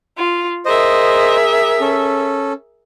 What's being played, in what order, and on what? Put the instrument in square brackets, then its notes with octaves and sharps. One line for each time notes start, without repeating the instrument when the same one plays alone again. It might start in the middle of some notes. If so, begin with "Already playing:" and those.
[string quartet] F4
[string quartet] G#4 A#4 E5 [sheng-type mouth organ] C5 D#5
[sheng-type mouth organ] C#4 A4